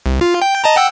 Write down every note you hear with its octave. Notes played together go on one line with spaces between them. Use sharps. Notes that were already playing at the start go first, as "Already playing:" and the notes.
C2
F4
G5
D#5 A5 A#5
F#5 G5 E6